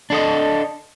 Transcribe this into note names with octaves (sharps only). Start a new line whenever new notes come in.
D4 A4 D#5